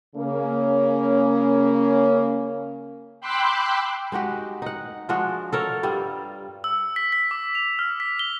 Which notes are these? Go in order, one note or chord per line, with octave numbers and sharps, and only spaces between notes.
C#3 A#3 C#4
G5 B5 C6 D6 E6 F#6
G#3 D#4 F#4 G4
D#4 F#5
F3 G#3 D4 F#4
A4 A#4 C#5
G2 G3 F4
E6
B6
B6
D6
F7
F6
B6
G7